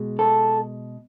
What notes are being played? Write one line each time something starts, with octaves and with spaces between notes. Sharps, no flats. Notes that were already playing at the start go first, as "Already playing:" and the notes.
Already playing: B2 G#3
A4